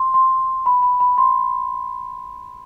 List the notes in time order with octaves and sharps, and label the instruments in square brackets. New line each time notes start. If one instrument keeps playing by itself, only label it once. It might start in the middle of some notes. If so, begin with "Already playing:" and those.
Already playing: [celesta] C6
C6
B5
B5
B5
C6